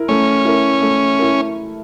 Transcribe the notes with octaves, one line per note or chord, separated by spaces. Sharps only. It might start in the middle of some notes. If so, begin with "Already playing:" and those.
Already playing: E4 A#4
A3 C#4
E4 A#4
A3
E4 A#4